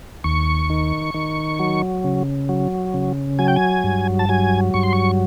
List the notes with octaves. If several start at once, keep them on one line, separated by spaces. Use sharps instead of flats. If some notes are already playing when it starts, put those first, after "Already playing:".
D#2 C#6
D#3
D#3
F#3
C#3
F#3
C#3
F#3 G#5
G5
G#5
G2
A5
F#3 G#5
G2 C#6
C6
C#6